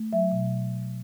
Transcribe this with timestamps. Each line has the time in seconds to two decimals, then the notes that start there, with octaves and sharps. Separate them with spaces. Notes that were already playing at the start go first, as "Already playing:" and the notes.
Already playing: A3
0.13 F#3 E5
0.32 B2